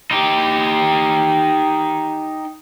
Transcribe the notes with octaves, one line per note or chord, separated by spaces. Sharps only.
D#4 G4